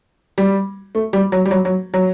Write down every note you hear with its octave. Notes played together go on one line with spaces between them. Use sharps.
G3
A3
G3
F#3
G3
F#3
F#3
F#3